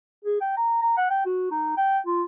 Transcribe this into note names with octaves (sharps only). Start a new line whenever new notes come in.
G#4
G5
A#5
A#5
F#5
G5
F#4
D#4
G5
F4